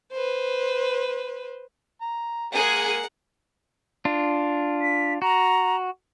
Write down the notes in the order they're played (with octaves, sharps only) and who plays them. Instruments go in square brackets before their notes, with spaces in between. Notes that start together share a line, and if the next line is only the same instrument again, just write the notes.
[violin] B4 C5
[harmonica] A#5
[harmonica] G#3 A#3 [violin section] G#4 [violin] A#4 F#5
[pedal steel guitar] D4 F4
[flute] B6
[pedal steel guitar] F#4 [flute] A#5